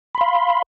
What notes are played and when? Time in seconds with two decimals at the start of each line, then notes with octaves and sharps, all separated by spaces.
0.15 B5
0.18 C6
0.21 F5